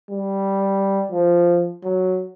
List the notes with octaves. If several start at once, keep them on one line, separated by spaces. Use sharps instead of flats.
G3
F3
F#3